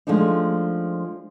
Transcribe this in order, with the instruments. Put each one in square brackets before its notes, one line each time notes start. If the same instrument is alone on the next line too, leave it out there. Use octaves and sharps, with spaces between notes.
[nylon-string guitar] F3 G#3 A3 D4 D#4